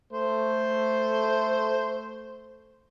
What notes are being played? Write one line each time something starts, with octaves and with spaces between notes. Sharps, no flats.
A3 C5